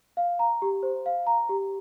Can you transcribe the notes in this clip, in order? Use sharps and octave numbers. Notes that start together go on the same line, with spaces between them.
F5
A#5
G4
C5
F5
A#5
G4